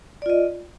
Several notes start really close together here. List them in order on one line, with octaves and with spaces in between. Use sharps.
D5 F4 D#5